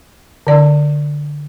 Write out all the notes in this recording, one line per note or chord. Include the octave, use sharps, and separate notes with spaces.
D3 D5